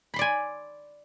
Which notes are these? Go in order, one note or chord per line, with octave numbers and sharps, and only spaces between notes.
D5 G#5 B5 C6